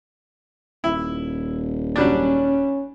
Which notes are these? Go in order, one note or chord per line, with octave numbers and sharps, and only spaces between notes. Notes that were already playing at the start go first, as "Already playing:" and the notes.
D#1 E4
F#3 G3 C#4 D4